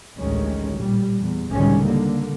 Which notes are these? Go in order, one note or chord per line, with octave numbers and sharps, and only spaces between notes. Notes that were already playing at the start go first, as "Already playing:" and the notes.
A1 D2 D#3 G#3 C#4
A#2 G3
E2
C#2 A2 D3 D#3 G3 C#4
D3 A#3